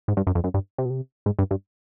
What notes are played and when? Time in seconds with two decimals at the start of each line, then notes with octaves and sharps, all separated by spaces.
0.08 G#2
0.17 G2
0.27 F#2
0.35 F2
0.44 F#2
0.54 G2
0.78 C3
0.85 B2
0.90 C3
1.26 G#2
1.39 G2
1.51 G2